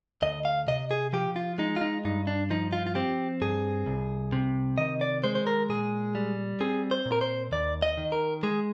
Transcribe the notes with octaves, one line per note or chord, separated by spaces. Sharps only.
D2 D#5
F5
C3 D#5
G#4
F3 G4
F4
G#3 D#4
F4
D#4
G2 D#4
D4
F3 D#4
F4
F4
C4 G4
G2 G#4
C2
C3
D#3 D#5
D5
G#3 C5
C5
A#4
A#2 G#4
G3
C4 G#4
C5
A#2
A#4
C5
D#2 D5
D#5
D#3
A#4
G#3 G#4